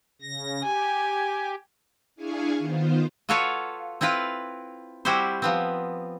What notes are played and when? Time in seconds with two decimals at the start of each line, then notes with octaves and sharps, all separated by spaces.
0.22 C#3 A#6
0.63 G4 G#5
2.16 D4 E4 G#4 F5 G#5 C#6
2.59 D#3 B3 F4 C5
3.29 F4 F#4 A4 B4 C#5 F5
4.01 C4 E4 F4 B4 F5
5.05 G3 C4 E4 F#4 G4 C5
5.42 F3 B3 C4